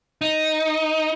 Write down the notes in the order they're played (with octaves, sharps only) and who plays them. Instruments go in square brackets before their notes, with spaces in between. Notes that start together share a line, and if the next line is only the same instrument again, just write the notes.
[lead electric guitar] D#4